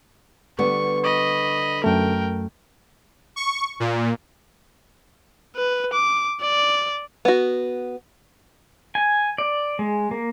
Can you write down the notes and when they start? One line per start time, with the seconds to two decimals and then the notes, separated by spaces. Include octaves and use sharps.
0.59 D3 G3 B3 C#6
1.04 D#5 B5 C#6
1.84 F#2 A3 A#4 G5
3.36 C#6
3.80 A#2
5.56 B4
5.93 D6
6.41 D5
7.25 B3 F#4
8.95 G#5
9.38 D5
9.79 G#3
10.11 A#3